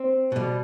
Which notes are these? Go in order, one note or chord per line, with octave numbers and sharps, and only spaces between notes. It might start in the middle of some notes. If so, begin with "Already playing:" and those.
Already playing: C4
B2 G3